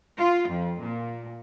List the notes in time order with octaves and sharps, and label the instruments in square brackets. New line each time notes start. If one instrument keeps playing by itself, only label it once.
[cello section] F4
F2
A#2